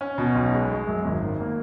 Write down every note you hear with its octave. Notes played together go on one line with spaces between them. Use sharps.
C#4
B2
B1
G#3
G#3
F#2
G#1
D#3
A#3